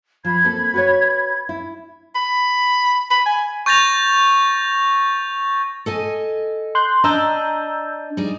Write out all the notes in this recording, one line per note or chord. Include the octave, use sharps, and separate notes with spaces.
F3 B5 G#6
A#3 C4 A4
F#4 B4 C#5
E4
B5
B5
G#5
C#6 G6 A6 A#6 F7
A4 D#5 G#5
C6 F#6 G6
D4 D5 D#5 A#5 E6 G6
G3 D#4 G#4